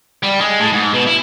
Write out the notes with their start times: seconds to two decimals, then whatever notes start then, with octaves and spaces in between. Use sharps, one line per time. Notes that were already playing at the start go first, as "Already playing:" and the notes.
0.23 G3
0.41 G#3
0.60 A2
0.73 G#2
0.94 B2
1.07 E4